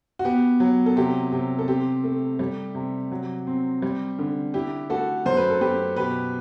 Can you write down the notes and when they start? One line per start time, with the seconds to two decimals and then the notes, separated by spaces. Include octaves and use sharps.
0.19 F#4
0.25 B3 G4
0.60 F#3
0.86 A4
0.96 C3 G4
1.32 C3 G4
1.59 A4
1.68 C4 G4
2.04 A3
2.39 G3
2.75 C3
3.11 F#3
3.47 C4
3.82 G3
4.19 D3
4.54 E4 G4
4.90 A3 F#4 A4
5.26 F#2 C5
5.37 B4
5.50 A4
5.61 F#2 G4 B4
5.96 B2 G4 B4